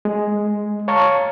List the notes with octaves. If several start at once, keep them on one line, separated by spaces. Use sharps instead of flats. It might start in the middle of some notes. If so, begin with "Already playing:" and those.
G#3
C#5 F5 A5 A#5 C#6